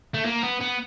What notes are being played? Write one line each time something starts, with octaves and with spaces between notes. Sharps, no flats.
A3
A#3
B3
B3